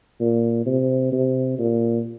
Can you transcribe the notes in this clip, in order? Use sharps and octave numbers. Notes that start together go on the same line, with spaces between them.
A#2
C3
C3
A#2